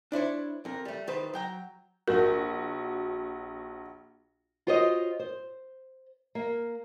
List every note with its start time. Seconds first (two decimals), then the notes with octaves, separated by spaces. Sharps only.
0.12 D4 E4 C5 C#5
0.65 F2 A#4
0.85 G3 A3
1.07 A2 D#3 B4 C5
1.34 F#3 G5 A#5
2.08 A#1 F#4 A#4
4.67 F4 F#4 C5 C#5 D#5
5.19 C5
6.35 A#3